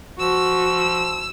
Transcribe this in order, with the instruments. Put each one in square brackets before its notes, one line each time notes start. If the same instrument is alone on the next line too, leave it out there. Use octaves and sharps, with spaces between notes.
[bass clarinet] F3 [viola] F#4 [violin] E6